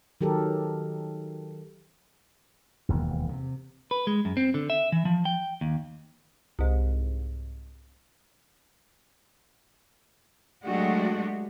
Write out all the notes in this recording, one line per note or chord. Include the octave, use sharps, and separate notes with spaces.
D#3 F#3 G4 A4 A#4
E1 D#2
C3
B4
G#3
F#2
C4
D3
E5
E3
F3
G5
D#2
C2 G#2
F#3 G#3 A3 D4 F#4 G4